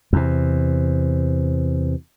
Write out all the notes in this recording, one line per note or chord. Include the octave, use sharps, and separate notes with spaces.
E2 C3